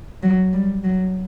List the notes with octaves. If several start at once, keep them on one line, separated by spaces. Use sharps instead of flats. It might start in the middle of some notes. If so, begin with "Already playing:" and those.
F#3
G3
F#3